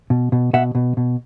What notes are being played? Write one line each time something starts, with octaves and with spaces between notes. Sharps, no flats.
B2
B2
B2 E5 F#5
B2
B2